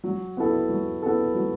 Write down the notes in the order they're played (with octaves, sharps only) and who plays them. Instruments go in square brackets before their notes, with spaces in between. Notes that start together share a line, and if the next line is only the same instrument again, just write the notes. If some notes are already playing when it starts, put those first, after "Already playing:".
[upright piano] F#3
B3 E4 A4
F#3
B3 E4 A4
F#3